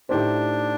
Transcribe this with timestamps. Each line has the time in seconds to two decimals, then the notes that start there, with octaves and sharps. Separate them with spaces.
0.09 A2 A3 D4 D#4 G4 C5